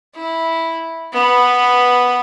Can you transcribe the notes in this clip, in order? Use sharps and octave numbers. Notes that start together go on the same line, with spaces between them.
E4
B3 B4